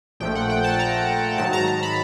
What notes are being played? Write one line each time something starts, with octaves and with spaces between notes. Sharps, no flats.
A#1 A#2 F3 A3 G5
F#5
G5
A5
A#5
G#2 D#3 F#3 A5
A#5
A#5
B5